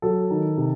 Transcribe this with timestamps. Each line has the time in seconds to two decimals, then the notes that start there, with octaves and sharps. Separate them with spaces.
0.02 F#3 A4
0.30 D#3
0.57 C3